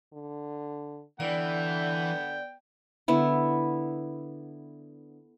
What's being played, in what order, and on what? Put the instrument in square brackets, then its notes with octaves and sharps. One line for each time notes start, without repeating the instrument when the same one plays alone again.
[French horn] D3
[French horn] D3 [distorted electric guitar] E3 [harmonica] B3 G5 [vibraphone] D5
[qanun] D3 B3 E4